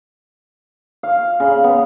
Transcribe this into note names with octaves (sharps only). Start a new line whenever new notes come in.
F5
C#3
B3